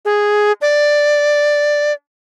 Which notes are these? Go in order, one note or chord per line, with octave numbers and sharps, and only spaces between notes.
G#4
D5